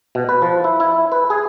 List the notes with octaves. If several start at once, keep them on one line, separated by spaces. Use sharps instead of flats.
B2
B4
F3
E4
E4
B4
G#4